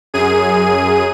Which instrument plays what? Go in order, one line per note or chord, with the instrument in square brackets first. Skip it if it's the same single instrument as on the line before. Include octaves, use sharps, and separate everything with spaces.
[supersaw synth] F#2 G#4 D#7